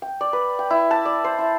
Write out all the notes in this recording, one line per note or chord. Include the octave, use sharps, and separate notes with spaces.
G5
D5
B4
G5
E4
A5
D5
C5
E4